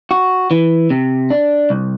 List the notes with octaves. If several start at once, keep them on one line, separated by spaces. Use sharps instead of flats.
F#4
E3
C3
D4
C2